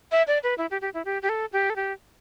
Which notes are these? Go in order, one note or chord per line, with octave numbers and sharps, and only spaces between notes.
E5
D5
B4
E4
G4
G4
E4
G4
G4
A4
G4
A4
G4